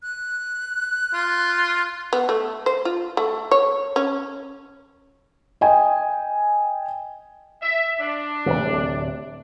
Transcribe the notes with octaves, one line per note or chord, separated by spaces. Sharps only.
F#6
F4
B3
A3
C5
F4
A3
C#5
C#4
D#5 G5 G#5
E5
D4
D1 G#1 C3